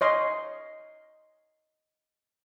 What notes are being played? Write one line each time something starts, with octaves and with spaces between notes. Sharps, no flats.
C#5 D#5 C6